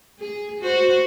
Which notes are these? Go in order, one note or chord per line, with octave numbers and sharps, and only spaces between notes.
G#4
F#4 C5